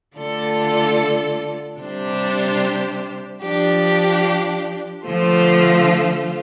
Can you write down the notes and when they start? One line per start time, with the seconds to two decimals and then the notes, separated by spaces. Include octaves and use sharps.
0.17 D3 A3 F4 A4 D5
1.80 C3 G3 D4 G4 C5
3.42 F3 D4 G4
5.05 D3 F3 A3 F4 C5